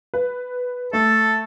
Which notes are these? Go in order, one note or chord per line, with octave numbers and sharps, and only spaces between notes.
B4
A3 A4